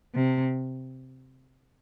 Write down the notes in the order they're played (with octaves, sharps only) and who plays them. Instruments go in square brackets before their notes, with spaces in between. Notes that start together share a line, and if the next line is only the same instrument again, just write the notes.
[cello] C3